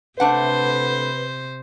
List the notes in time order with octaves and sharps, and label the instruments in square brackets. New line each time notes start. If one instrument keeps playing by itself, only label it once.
[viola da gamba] C3 C5 [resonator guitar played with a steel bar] A3 D4 F#5 [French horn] B4